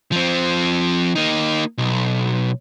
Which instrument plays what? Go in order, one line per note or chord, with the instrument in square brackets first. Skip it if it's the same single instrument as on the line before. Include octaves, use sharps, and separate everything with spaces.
[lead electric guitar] F3 C4
A#3 D#4
B1